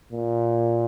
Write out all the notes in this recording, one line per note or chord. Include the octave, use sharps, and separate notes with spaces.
A#2